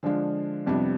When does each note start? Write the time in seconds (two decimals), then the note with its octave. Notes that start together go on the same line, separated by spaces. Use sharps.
0.03 D3 F3 G#3 D4 F4
0.67 F2 C3 G3 B3 D4